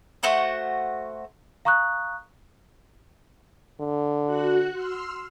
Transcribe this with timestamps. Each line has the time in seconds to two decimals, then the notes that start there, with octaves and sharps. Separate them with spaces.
0.23 A3 F#4 C5 F#5
1.65 F5 A#5 C#6 D#6 F#6
3.80 D3
4.27 F#4 F#6
4.73 C6 E6 F6